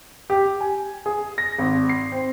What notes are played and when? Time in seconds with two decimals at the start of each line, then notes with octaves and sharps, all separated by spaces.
0.30 G4
0.61 G#5
1.06 G#4
1.38 A#6
1.58 G#1
1.89 C7
2.12 C4